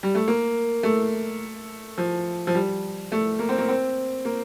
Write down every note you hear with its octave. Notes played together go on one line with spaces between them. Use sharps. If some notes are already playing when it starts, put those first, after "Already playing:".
G3
A3
A#3
A3
F3
F3
G3
A3
A#3
C4
A#3
C4
A#3